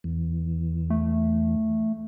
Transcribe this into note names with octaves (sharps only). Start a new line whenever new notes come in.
E2
A3